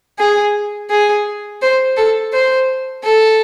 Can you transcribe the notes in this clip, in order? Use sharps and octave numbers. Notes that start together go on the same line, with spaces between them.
G#4
G#4
C5
A4
C5
A4